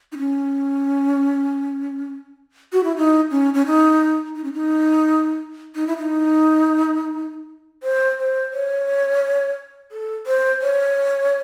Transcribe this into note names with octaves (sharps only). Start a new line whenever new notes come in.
D#4
C#4
F#4
E4
D#4
C#4
C#4
D#4
D#4
C#4
D#4
D#4
E4
D#4
C5
C5
C#5
A4
C5
C#5